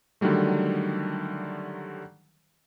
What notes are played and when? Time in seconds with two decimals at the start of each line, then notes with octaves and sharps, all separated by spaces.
0.21 D3 D#3 F#3 G3 A3